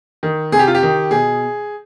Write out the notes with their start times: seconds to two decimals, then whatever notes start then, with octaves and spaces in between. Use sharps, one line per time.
0.23 D#3
0.52 C3 G#4
0.59 G4
0.67 F4
0.75 G4
0.83 D#3
1.11 B2 G#4